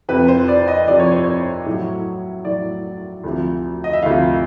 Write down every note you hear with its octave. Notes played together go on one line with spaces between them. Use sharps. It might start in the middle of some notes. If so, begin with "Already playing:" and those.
F2 C3 F3 B4
C5
D5
D#5
F2 C3 F3 D5
C#5
C5
C#5
A2 F#3
A2 F#3 D5
D2 C3 F3
D#5
E5
D2 C3 F3 F5